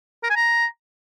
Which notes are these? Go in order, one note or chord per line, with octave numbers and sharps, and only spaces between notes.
A#4
G#5
A#5